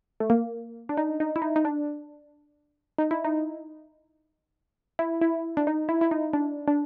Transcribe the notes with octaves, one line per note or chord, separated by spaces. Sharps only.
A3
A#3
D4
D#4
D#4
E4
D#4
D#4
D4
D#4
E4
D#4
E4
E4
D4
D#4
E4
E4
D#4
D4
D4